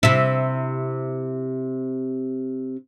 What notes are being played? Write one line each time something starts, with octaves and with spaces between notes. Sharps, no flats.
C3 E4